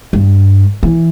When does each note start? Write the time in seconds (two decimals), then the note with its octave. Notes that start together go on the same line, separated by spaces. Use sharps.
0.13 G2
0.83 E3